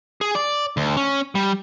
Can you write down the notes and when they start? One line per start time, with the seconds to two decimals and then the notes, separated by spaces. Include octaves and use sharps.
0.21 G#4
0.35 D5
0.77 D2
0.97 C#4
1.35 G3